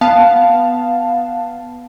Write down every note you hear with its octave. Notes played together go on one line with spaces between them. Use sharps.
B3 F5 A5